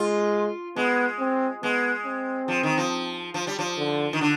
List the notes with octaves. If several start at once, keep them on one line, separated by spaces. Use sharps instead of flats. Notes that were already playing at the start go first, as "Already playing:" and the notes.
Already playing: G#3 F4
G#3 B3
C4
G#3 B3
C4
F3
D#3
F3
F3
G3
F3
D3
D#3
D3